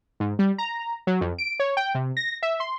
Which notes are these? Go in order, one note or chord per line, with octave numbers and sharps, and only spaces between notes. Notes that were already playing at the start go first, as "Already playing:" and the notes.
G#2
G3
A#5
F#3
F2
D7
C#5
G5
C3
A#6
E5
C6